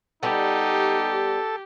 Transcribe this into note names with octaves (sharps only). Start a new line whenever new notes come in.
G3 B3 D#4 G4 A4